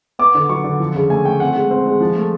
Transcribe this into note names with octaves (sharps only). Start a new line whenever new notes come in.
B3 D6
D3
F#3 C#6
D3
F3
C#3
A3 G#5
A3 G5
C4 F#5
G#3
C4 C5
G#3
F3
A3